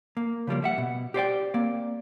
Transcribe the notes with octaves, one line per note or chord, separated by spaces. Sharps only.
A#3
C#3 F3 G3 A#3
G3 E5 F#5
B2
G4 C5 D5 G5
A#3 C4 D5